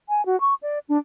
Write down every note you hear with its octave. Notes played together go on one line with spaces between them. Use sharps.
G#5
F#4
C#6
D5
D4